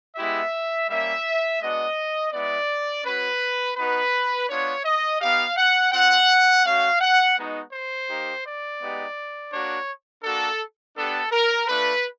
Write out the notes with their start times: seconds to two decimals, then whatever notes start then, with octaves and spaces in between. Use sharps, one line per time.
0.16 G#3 B3 E4 G4 E5
0.88 G3 A#3 C#4 E5
1.60 G#3 B3 D4 F#4 D#5
2.32 G#3 B3 E4 D5
3.04 G#3 C#4 F#4 B4
3.76 B3 D#4 F#4 B4
4.48 B3 D4 F4 C#5
4.84 D#5
5.20 B3 D#4 G4 F5
5.55 F#5
5.92 C4 F4 F#5
6.63 A3 C#4 F#4 F5
7.00 F#5
7.36 G#3 B3 D#4 F#4
7.71 C5
8.07 A#3 D#4 G4
8.44 D5
8.80 G#3 B3 D#4 G4
9.52 A#3 D4 F#4 C#5
10.23 A#3 D4 F#4 A4
10.95 B3 D4 G4 A4
11.31 A#4
11.68 A3 D4 F4 B4